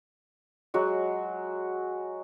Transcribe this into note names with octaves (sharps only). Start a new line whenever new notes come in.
F#3 G#3 F#4